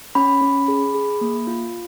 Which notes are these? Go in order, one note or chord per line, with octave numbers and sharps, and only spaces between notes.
C#4 B5
C#4
G#4
G#4
A#3
F4